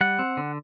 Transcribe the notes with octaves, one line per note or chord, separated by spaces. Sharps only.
G3 F#5
C4
D3